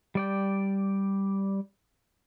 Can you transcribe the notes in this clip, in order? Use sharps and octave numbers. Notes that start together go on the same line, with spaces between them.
G3 D5 G5